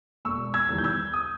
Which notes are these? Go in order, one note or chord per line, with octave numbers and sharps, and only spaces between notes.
E1 C#6 E6
E6 G#6
E2 D#3 G3
G6
E6 G#6
D#6